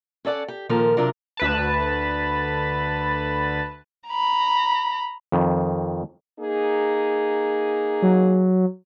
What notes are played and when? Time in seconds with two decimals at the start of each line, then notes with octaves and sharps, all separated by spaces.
0.25 C#4 A4 D5 F#5
0.48 G4
0.69 A#2 D#3 F3 A4 A#4
0.97 C3 F#3 D4 F4 A#4
1.37 D2 B4 A5
4.08 A#5 B5
5.32 F2 D#3
6.40 A#3 D#4 G#4
8.02 F#3